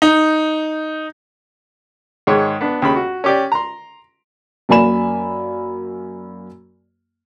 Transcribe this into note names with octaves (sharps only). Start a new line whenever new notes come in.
D#4
G#2 D#3 G#3 C#5
B3 D4
D#2 C#3 B5
F#4
C#4 G4 D5
A#5 C6
F#2 A#3 D5 G#5 B5 E7